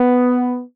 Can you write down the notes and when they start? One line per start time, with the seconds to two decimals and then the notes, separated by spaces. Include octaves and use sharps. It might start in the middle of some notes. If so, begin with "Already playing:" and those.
Already playing: B3